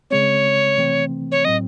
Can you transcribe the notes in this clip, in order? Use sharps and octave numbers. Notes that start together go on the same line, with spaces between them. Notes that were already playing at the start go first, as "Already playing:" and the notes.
C#3 G#3 C4 C#5
C3 E3 A3 C4
C#5
A2 F#3 C4 D#5